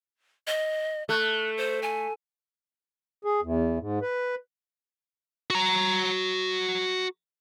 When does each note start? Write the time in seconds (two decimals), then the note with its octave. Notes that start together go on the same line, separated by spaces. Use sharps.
0.47 D#5
1.09 A3 F#6
1.57 C5
1.83 G#5
3.25 G#4
3.42 E2
3.79 G#2
4.02 B4
5.50 F#4 A#5